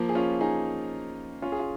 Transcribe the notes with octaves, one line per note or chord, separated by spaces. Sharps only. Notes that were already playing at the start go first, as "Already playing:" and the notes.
Already playing: F3 A#3
G#4
C#4 F4
D#4 G#4
C#4 F4
G#4
F4